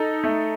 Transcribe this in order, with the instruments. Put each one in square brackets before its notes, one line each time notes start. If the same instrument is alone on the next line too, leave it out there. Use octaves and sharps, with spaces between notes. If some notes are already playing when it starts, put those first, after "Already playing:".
Already playing: [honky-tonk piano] D#4 [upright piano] A4
[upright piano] A3